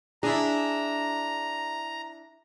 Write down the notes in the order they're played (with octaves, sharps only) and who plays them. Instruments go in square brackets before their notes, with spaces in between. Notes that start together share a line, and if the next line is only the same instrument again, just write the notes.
[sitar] D4 E4 [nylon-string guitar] G#4 [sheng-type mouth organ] A#5